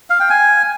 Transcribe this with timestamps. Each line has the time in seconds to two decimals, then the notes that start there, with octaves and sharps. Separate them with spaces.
0.10 F5
0.20 G5
0.30 G#5